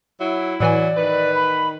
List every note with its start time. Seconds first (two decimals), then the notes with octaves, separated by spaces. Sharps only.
0.20 F#3 E4
0.60 A2 E3 F#3 D5 G#5
0.96 D#3 B4
1.35 B5